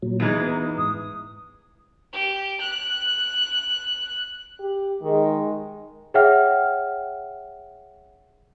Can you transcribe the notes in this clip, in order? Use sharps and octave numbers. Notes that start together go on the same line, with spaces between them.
A#2 F#3
E2 E3 G#3 D#4
B3
G#2 D#6
G4
F#6
G4
D#3 G#3
G#4 C#5 E5 F#5 G5 F6